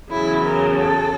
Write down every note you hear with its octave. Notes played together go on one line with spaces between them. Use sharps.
E2 C#3 F#3 E4
A#4
A4